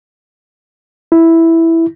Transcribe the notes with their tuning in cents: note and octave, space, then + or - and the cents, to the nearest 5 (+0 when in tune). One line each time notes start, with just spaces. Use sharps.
E4 +0